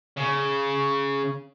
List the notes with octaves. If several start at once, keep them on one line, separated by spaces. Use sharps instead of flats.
C#3